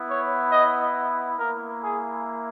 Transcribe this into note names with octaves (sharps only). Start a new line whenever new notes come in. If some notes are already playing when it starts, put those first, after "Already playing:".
Already playing: B3 E4
C#5
D#5
A#3 E4 A#4
G#4